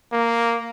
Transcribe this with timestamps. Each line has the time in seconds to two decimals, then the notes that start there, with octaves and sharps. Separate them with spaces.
0.12 A#3